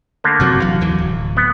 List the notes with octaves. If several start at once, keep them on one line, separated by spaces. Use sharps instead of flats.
D3 A3 A#3
G1 C3 F#3
E3 F#3 F5
D#2 E3 F#3
D1
B3